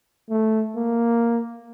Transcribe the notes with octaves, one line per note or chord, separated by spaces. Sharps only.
A3
A#3